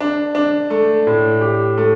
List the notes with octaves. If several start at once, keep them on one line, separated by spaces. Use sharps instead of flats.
D4
D4
A3
A2
G4
A3